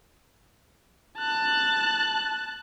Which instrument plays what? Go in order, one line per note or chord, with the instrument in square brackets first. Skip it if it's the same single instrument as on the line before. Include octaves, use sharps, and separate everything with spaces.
[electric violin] A5 F#6